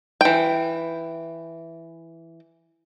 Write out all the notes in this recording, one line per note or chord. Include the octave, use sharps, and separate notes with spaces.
E3 G5